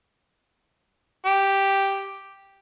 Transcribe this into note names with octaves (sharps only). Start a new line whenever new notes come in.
G4